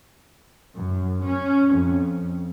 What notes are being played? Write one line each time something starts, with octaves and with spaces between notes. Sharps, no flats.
F#2
C#4
F2